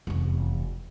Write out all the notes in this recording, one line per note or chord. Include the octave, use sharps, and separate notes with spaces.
F1 E2